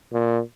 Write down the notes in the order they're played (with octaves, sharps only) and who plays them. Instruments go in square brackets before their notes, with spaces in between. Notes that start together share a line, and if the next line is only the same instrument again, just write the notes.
[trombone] A#2